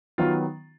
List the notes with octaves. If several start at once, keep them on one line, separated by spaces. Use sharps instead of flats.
D#3 F#3 B3 F4